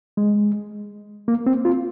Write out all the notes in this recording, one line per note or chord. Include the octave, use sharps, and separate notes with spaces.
G#3
A#3
C4
F4